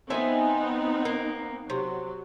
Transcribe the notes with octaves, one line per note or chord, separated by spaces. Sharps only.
F3 B3 C4 D#4 E5 G#5
A#3
C3 F#3